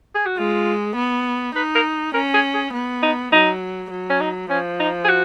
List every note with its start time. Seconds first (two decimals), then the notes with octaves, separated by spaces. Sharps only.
0.15 G#4
0.26 F#4
0.37 G#3 F4
0.96 B3
1.55 D#4 B4
1.75 A#4
2.14 C#4 A#4
2.34 G#4
2.54 G#4
2.74 B3
3.03 D#4
3.32 F#3 D#4
3.91 F#3
4.10 C#4
4.20 D#4
4.49 F3 C#4
4.80 D#4
5.04 G#4
5.08 F#4